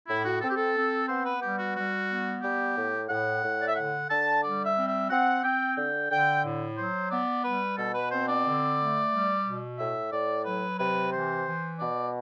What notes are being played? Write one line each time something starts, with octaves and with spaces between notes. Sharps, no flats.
A2 E4
F#4
C4 A4
G4
A4
C4
B3 C5
B4
G3 G4
F#4
G3 F#4
B3
G3 G4
A2
A2 F#5
A2
D5
E5
D3 F#5
D3 A5
G3 D5
E5
C4
E5
C4 F#5
C4 G5
D3 G5
D3 G5
A2
F#3 C5
B3 D5
G3 B4
B2 A4
B4
C4 C5
D5
D3
A3
G3
B2
A2 E5
A2 D5
F#3 B4
C3 B4
E3 C5
E3
B2 D5